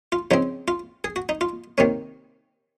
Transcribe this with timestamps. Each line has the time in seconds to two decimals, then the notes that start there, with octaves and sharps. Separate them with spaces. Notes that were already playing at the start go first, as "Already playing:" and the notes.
0.12 F4
0.31 C#3 F3 C4 D#4
0.68 F4
1.04 G#4
1.16 F#4
1.29 D#4
1.41 F4
1.78 C3 D#3 A#3 C#4